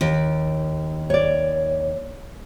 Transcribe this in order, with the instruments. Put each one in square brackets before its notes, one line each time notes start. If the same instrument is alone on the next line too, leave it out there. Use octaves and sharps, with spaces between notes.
[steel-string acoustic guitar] D#2
[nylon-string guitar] C#5 D5